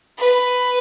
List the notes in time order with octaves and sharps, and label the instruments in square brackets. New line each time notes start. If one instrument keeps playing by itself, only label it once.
[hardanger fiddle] B4